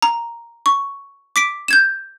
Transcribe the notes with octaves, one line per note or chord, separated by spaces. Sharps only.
A#5
C#6
D6 B6 D7
G6 G#6 E7